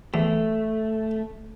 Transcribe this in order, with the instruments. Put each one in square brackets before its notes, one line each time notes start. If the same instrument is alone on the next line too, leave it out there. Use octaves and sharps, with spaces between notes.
[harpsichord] E2 [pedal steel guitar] A3